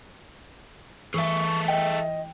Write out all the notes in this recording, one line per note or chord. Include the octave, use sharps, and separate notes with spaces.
E3 G#4 A4 E5 C#6
D#5 G5